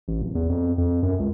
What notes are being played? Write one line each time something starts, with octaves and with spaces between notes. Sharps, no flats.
A1
D1
E2
F2
F2
F#2
C#2